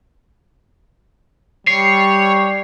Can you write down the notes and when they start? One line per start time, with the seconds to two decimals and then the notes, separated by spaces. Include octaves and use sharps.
1.67 G3 C#5 C7